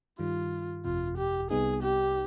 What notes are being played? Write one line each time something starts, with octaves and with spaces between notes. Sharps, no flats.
G2 D#3 G3 F4
G1 F2 C3 F4
G4
C2 C3 G3 B3 D#4 G#4
G4